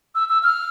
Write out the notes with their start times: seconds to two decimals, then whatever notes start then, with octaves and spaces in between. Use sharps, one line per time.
0.15 E6
0.29 E6
0.43 F6